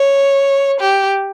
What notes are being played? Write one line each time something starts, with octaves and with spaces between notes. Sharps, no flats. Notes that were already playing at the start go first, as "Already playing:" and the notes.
Already playing: C#5
G4